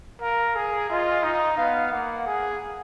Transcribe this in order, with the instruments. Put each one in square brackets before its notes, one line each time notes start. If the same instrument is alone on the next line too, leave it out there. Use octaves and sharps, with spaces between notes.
[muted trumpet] A#4 [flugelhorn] F5
[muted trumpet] G#4
[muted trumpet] F4 [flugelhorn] D#5
[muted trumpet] D#4
[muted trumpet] B3 [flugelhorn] F5
[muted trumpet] A#3 [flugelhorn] F#5
[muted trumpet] G#4